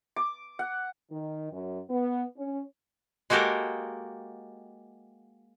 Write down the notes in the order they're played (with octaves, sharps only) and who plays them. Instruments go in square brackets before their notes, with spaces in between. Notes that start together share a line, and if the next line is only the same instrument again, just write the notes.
[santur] D6
F#5
[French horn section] D#3
F#2
B3
C#4
[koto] G#3 A#3 F#4 G4 A4 A#4